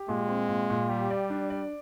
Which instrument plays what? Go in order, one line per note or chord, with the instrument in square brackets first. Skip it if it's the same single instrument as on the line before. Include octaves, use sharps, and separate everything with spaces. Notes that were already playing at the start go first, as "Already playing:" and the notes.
Already playing: [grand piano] G4
[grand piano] A#2 [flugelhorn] G#3
[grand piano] C4
A#2
A#2
[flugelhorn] G3 [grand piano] G4
[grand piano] D5
D4
D5